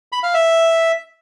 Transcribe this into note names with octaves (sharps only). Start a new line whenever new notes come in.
B5
F5
E5